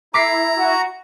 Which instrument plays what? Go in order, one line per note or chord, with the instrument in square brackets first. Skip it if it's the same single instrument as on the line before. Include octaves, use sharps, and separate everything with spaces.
[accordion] E4 [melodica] A#5 [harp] D6 B6 C7
[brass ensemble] F#4